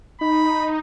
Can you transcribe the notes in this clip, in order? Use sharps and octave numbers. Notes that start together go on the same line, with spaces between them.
D#4 B5